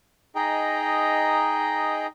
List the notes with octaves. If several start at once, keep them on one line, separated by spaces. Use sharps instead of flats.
D#4 G#4 D#5 G5 A#5